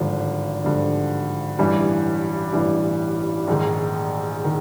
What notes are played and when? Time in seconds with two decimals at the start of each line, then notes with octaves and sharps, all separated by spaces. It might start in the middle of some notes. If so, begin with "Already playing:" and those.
Already playing: G#1 G2 D3 F3
0.64 G#1 G2 D3 F3
1.59 A1 G2 E3 G3
2.53 A1 G2 E3 G3
3.48 A#1 G#2 D#3
4.44 D#3